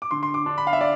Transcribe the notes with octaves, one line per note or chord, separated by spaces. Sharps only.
D6
D3 C6
C6
D6
D4
B5
F5
E5
D5